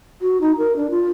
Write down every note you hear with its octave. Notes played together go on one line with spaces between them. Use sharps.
F#4
D#4
A#4
D4
F4